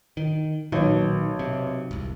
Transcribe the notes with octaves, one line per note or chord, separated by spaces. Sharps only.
D#3
B1 A#2 D#3
C3
E1 C2